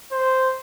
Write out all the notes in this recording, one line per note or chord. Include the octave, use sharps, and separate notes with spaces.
C5